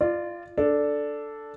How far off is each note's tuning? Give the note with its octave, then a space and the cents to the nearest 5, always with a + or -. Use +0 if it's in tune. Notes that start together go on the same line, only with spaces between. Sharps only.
F4 -15 D5 +25
D4 +0 A4 +0